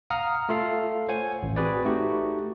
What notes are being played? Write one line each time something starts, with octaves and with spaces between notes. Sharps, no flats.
F5 F#5 A#5 D#6 F6
A3 F4 A4 F5
C5 C#5 F#5 G#5
A1
C4 F#4 G#4 B4 D5
A3 D#4 F#4 G4